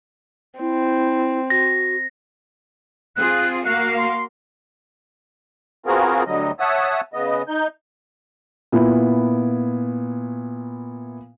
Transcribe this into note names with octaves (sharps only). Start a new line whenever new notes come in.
C4 E4
F#4 A#6
C4 F4 G#4 F#6
A#3 F#4 F5 F#6
C6
B3 C4 F4 F#4 G#4 A#4
D2 D3 F#3 G3 D#5
C#5 E5 F#5 A5 D#6 E6
C#3 B3 D#5
D#4 G6
A#2 B3 E4